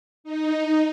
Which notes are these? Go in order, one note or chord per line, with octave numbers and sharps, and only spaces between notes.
D#4